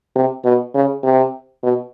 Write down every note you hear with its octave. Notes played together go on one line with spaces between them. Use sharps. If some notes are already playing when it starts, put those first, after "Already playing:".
C3
B2
C#3
C3
B2